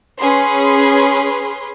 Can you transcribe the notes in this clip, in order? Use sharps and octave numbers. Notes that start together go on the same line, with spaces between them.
C#4 G#4 B4 C6